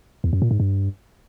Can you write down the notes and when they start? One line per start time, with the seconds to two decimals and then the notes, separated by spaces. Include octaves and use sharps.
0.24 E2
0.33 F#2
0.42 A#2
0.51 G#2
0.60 G2